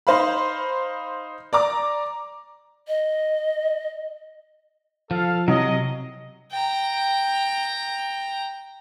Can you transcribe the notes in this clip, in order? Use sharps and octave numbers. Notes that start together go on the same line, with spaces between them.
D#4 C5 F5 B5
D5 A#5 D6
D#5
F3 A4 F5
C3 F#3 D#5
G5 A#5